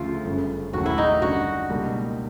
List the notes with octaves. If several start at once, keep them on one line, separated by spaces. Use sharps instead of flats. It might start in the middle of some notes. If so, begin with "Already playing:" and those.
Already playing: D2 C#3 F3 A3 F4
G1 F#2 C#3
D#2 C#3 F#3 A3 F#4
E4
D#4
F#2 D3 G3 F#4
C#2 B2 G3 A#3 D4